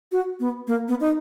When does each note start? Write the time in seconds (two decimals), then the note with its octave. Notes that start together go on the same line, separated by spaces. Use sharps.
0.12 F#4
0.40 B3
0.67 A#3
0.88 B3
1.01 D#4